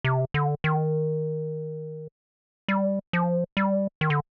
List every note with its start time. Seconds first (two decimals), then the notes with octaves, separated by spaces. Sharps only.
0.04 C3
0.34 D3
0.64 D#3
2.68 G3
3.13 F3
3.57 G3
4.01 D#3
4.10 D3